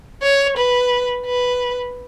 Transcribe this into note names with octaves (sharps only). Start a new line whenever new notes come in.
C#5
B4
B4